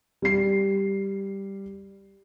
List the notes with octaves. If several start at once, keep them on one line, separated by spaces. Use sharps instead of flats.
G3 C7